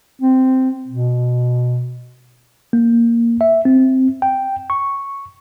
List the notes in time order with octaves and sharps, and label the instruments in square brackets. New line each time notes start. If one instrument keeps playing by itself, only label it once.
[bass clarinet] C4
B2
[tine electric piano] A#3
E5
C4
G5
C#6